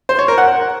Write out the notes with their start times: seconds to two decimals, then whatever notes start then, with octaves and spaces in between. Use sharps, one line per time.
0.09 C5
0.19 C#5
0.28 A#4
0.38 F#5